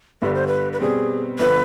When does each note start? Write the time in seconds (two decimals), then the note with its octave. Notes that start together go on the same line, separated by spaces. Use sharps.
0.22 G1 G2 D3 G3 B4
0.34 C5
0.47 B4
0.73 B4
0.80 B2 G3 C4 G#4
1.39 G1 D3 F3 B3 B4